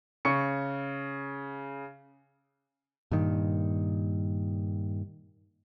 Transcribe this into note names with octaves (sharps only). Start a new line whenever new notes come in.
C#3 C#6 C#7
G2 A#2 D#3